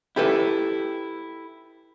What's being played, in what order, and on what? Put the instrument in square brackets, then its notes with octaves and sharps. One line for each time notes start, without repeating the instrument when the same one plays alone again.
[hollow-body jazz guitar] E4 G4 A4 B4